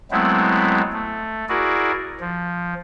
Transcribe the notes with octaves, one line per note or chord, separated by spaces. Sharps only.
F#3 G#3 A3 B3 C4 E4
A3
E4 F#4 G#4 A#4 D5
F3